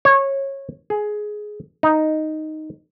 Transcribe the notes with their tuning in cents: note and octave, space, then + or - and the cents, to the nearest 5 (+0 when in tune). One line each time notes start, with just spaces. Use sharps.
C#5 -20
G#4 +15
D#4 +0